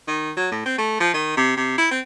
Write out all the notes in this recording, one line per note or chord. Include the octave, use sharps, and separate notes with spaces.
D#3
F#3
A2
C4
A3
F3
D#3
C3
C3
E4
C4